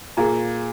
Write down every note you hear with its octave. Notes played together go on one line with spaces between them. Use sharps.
A#2 G#4 F5 A#5